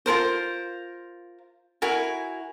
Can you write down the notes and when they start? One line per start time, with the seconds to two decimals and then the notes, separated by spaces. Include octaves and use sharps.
0.06 F4 G#4 A#4 C5
1.82 E4 F#4 A#4 G#5